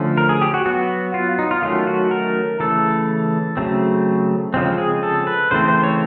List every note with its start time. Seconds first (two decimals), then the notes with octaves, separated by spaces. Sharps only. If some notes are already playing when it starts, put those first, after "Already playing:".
Already playing: D3 F3 A3 C#4
0.17 A#4
0.29 G#4
0.42 G4
0.54 F#4
0.66 F#3 B3 F#4
1.14 F4
1.39 D#4
1.51 F4
1.62 D#3 F#3 A3 C#4 F4
1.87 F#4
2.11 A#4
2.60 C#3 E3 A3 A4
3.57 C#3 F#3 A3 C4
4.54 C#3 F3 G#3 C4
4.78 G#4
5.03 A4
5.27 B4
5.51 C#3 E3 A3 C4 C5
5.68 C5
5.84 C#5